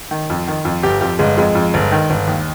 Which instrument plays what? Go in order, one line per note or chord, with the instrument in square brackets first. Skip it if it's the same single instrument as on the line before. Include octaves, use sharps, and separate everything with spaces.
[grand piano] D#3
F2
D#3
F2
G1 G4
F2 G4
G1 G#3
F2 G#3
F2
G1
D#3
G1
D#2